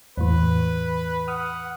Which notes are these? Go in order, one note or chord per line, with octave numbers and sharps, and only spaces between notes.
E2 A2 E3 B4
F#5 D#6 F6